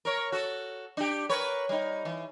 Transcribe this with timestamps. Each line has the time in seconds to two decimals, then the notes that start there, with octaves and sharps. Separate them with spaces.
0.05 A#4 C#5
0.32 F#4 A4
0.97 D4 G4
1.29 A#4 B4 C#5
1.69 G3 D#4
2.05 E3